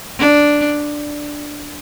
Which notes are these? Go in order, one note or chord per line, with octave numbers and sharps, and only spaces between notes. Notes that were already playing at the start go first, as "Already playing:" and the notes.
D4